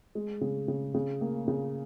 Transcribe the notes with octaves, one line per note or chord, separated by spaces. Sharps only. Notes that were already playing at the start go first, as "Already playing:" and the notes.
G#3
C#3
C#3
C#3
A#3
C#3